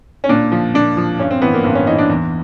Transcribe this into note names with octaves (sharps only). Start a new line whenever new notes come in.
C#4
A#2 D4
F3
A#2 D4
F3
G2 C#4
C4
E3 B3
A#3
G2 C4
C#4
E3 D#4
D4
E2